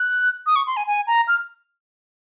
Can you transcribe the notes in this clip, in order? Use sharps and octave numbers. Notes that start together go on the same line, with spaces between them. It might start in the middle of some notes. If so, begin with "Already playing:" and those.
Already playing: F#6
D#6
C#6
C6
G#5
G#5
A#5
F6